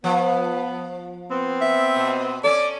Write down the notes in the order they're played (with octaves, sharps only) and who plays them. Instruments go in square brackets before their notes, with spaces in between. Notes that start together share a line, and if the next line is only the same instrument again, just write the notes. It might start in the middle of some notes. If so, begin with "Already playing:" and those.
[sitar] F3 [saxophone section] B3
[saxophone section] B3 C4
[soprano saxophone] E5
[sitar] B2
[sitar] C#4 A4 [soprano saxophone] D5